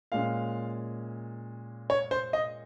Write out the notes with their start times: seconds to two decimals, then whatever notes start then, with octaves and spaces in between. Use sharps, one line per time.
0.12 A#2 G#3 C#4 F5
1.90 C#5
2.11 C5
2.33 D#5